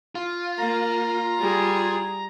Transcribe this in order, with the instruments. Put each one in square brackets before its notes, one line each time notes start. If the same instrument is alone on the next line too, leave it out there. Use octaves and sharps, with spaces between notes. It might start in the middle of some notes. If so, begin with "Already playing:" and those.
[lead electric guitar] F4
[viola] A#3 [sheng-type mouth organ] A#5
[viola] G3 G#4